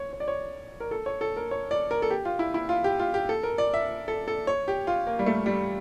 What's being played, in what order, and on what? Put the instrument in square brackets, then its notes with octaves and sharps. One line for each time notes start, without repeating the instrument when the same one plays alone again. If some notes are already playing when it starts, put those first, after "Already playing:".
Already playing: [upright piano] C#5
C#5
D5
C#5
A#4
A4
C#5
A4
A#4
C#5
D5
A#4
A4
G4
F4
E4
E4
F4
G4
F4
G4
A4
A#4
D5
E5
A4
A4
C#5
G4
F4
A#3
G3
A3
G3